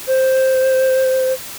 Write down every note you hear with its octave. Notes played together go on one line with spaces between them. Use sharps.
C5